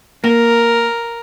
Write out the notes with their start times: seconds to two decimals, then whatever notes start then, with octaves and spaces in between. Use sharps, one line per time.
0.24 A#3 A#4